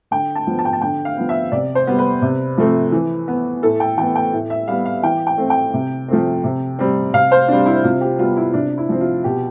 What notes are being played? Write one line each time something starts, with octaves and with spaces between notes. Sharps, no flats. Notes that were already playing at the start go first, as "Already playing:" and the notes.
D3 G5
A5
F3 B3
A5
G5
A5
D3 G5
F5
F3 B3
E5
C3 D5
C5
G3 B3
B4
C3
F3 A3 C4
E3
B3
A2 A4
G5
E3 B3 G5
G5
A2
E5
G3 B3 F5
F5
E3 G5
G5
A3 C4
G5
C3
F3 A3 C4
C3
G3 C4
C3 F5
C5
G3 C4 D4
E4
C3 F4
G4
G3 B3 F4
E4
C3 D4
E4
F3 C4
F4
B2 G4